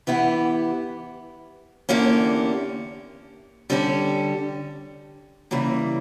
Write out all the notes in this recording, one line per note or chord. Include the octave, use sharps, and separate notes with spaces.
E3 B3 E4 G4
E2 D3 A#3 C#4 G4
D3 G3 C#4 G4
C#3 E3 G3 A#3